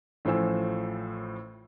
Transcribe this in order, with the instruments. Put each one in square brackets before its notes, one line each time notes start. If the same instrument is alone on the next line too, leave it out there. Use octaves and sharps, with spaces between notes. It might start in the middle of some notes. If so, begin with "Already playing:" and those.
[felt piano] A1 A2 F3 C5 G#5 E6